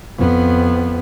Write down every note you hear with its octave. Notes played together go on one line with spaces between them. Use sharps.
F2 B3